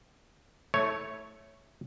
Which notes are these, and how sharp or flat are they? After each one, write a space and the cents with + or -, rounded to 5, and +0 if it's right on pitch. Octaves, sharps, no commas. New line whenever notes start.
A3 +0 E4 -30 C#5 +0